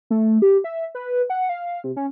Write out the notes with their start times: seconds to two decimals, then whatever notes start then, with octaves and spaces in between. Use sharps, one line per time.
0.10 A3
0.42 G4
0.64 E5
0.95 B4
1.30 F#5
1.49 F5
1.84 C3
1.96 C#4